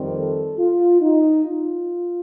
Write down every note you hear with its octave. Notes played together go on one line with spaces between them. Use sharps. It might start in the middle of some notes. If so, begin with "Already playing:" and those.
Already playing: F2 D#3 G3 C4
A4
F4
D#4
F4